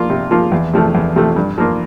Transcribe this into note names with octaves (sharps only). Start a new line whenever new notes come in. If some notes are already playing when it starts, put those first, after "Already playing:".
Already playing: F3 A#3 F4
C3
F3 A#3 F4
E2
C3 F3 A3
E2
C3 F3 A3
G2
F3 A#3 F4